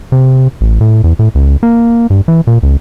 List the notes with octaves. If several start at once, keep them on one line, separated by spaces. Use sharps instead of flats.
C3
A1
A2
E2
A2
C#2
A#3
G2
E3
A#2
C#2